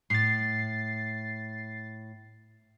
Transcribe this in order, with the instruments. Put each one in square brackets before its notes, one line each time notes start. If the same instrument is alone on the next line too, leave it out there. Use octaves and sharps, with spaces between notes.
[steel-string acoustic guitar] A2 [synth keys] A6 C7